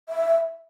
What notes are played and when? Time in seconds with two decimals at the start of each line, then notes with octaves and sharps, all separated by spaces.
0.09 E5